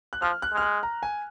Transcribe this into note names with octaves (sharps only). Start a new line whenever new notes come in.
F#6
F3 F6
F#6
G#3
F6
F#6
A#5
G#5